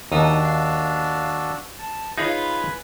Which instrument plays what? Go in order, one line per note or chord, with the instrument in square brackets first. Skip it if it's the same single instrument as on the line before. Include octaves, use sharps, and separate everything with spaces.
[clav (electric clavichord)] D#2 [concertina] D4 F#4 E6 [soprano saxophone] D#4
[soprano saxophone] F5
[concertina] A5
[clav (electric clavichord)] D#4 G#4 C#5 [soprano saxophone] F4 [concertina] B4 G#5 B5